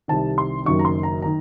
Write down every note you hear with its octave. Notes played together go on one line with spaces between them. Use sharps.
C2 C3 D#3 A5
C6
F#1 F#2 D#3 C#6
A#5
C6
A#5
D#3 A#5